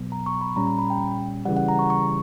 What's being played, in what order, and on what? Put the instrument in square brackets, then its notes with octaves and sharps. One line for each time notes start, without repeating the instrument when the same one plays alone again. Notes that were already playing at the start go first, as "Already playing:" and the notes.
Already playing: [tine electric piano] B2 F#3 B3
[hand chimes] A#5
C#6
B5
[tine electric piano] A#2 G3 C#4 [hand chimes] A#5
[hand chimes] A#5
B5
G5
[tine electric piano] C#3 E3 G3 [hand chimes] F#5
[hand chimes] F#5
A#5
C#6
C#6